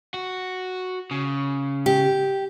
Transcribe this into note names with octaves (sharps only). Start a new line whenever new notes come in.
F#4
C#3
G4